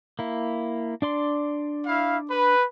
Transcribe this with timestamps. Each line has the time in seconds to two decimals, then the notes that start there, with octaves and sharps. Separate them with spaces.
0.19 A#3 E4
1.02 D4 D5 C6
1.86 E4 F5
2.30 B4